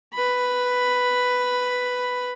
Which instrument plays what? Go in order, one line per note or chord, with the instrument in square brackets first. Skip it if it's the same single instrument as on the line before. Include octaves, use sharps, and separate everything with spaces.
[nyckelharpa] B4 B5